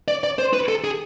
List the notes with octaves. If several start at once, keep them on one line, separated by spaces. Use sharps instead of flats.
D5
D5
C5
B4
A4
G#4